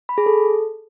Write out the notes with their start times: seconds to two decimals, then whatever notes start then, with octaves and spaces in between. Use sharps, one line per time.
0.09 B5
0.18 G#4
0.26 A4